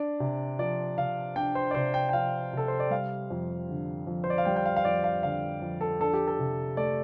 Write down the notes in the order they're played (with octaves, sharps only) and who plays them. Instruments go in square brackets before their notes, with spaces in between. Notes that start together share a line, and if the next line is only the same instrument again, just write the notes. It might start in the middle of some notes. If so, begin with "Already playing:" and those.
Already playing: [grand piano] D4 D5
C3
F3 D5
C3 F5
D4 G5
C5
D5
C3 C5
G5
G5
F3 F5
C3 A4
C5
D5
G3 F5
F2
D3
F2
C5
D5
F5
G3 G5
G5
F5
F5
F2 D5
F5
D3 F5
F2
A4
D4 A4
G4
A4
C3
A3 D5